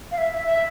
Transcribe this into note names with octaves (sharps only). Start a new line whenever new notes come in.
F5
E5
E5